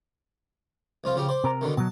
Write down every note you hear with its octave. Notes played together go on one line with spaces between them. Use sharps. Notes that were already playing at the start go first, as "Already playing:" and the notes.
C2 F3 F4
C#3 F3 G4
C5 D5
C3 A#4 A#5
B2 D3 D#3
B2 F#3 A5